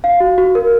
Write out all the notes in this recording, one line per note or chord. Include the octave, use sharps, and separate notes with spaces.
F5
F#4
F#4
A#4